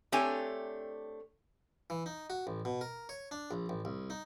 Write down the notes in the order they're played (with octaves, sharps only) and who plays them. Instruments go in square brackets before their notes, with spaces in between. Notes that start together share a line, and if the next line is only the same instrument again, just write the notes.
[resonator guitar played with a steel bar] A3 C4 D4 G4 C#5 G#5
[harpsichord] E3
D#4
F#4
A1
B2
A#4
C#5
D4
A#1
A1
C2
D#4